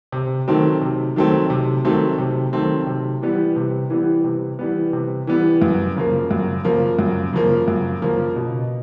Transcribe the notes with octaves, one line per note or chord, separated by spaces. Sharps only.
C3
D#3 F#3 A3 C4
C3
D#3 F#3 A3 C4
C3
D#3 F#3 A3 C4
C3
D#3 F#3 A3 C4
C3
E3 G3 B3
C3
E3 G3 B3
C3
E3 G3 B3
C3
E3 G3 B3
F#2
C#3 F3 A#3
F#2
C#3 F3 A#3
F#2
C#3 F3 A#3
F#2
C#3 F3 A#3
B2